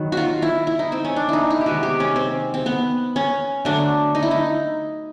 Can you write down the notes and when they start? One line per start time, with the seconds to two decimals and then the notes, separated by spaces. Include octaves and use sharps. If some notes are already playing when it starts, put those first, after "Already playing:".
Already playing: D#3 F#3 B3
0.12 F4 F#4
0.42 E4
0.67 E4
0.79 D#4
0.92 C4
1.05 C#4
1.16 D4
1.29 D#4 E4
1.50 E4
1.61 G4
1.66 C3 D#3 G#3 B3 F#4
1.83 G4
2.00 C#4
2.16 C4
2.54 C4
2.66 B3
3.16 C#4
3.65 D3 F#3 A3 D4
4.15 D#4
4.23 E4
4.31 D#4